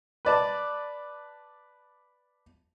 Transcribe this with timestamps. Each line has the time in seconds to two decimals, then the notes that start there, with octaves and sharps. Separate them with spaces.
0.25 B4 D5 A5